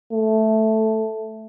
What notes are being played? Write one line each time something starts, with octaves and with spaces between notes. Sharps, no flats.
A3